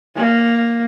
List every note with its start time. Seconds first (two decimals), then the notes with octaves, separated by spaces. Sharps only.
0.15 A#3